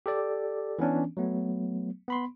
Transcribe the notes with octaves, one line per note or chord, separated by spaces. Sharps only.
G4 A4 D5
E3 B3 C#4 D4
F#3 A3 B3
B3 B5 C6